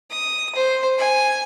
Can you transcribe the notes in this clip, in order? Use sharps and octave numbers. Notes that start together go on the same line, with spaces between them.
D#6
C5
G#5